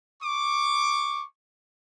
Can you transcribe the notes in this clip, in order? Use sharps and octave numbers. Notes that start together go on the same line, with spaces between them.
C#6 D6